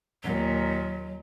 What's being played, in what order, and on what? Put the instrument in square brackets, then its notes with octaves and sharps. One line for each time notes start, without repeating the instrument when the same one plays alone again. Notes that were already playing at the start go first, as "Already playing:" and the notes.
[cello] D#2 A#2 [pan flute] F#3